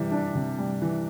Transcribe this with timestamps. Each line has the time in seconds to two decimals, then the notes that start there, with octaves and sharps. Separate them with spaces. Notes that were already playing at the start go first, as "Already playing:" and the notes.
Already playing: C3 E3 G3
0.12 D4
0.35 C3
0.58 G3
0.82 E3